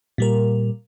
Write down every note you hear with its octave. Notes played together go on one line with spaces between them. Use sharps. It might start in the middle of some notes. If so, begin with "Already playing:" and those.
A#2 G3 A#4